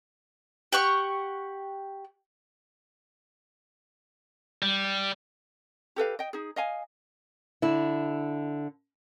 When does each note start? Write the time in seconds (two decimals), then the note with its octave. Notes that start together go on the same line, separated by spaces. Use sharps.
0.72 G4 F#5 C#6
4.63 G3
5.96 G4 A4 B4 F5
6.19 D#5 G5
6.33 D#4 G#4
6.56 D#5 F5 G#5
7.62 D3 E4